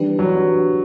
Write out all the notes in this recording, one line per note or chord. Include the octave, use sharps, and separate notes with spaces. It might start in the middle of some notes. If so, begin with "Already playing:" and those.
Already playing: E3 G3 D4 G4 B4
F#3